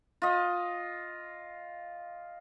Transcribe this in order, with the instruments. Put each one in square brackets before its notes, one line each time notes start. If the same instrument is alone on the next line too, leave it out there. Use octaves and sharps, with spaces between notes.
[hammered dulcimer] F4 D#5